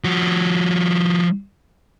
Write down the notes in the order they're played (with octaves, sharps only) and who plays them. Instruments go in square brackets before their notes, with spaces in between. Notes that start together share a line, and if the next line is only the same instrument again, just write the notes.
[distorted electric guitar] F3 F#4